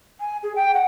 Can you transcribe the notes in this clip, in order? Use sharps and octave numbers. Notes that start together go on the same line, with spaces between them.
G#5
G#4
G5
F#5